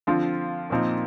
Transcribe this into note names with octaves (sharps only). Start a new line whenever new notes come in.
D3 F3 C4 F4
A#2 F3 C4 D#4